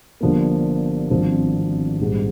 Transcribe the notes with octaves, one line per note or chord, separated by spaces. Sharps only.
G1 G2 F3 A#3
G#1 G2 F3 C4
A#1 G#2 G3